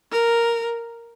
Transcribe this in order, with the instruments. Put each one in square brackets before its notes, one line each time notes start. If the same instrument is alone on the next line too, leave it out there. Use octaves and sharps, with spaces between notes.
[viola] A#4